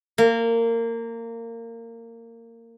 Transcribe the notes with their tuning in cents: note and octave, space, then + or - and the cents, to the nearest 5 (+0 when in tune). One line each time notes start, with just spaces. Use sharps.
A#3 -20